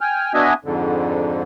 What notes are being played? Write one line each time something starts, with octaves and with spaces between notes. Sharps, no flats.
G5 G#5 F6
B3 D4 F#4 D#5 E5 G#5
F2 G#2 D3